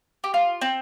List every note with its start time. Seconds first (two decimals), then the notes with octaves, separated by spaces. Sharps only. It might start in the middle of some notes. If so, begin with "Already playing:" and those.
0.24 G4
0.34 F4
0.61 C4